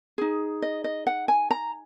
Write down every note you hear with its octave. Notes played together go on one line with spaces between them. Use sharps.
D#4 G#4
D#5
D#5
F#5
G#5
A#5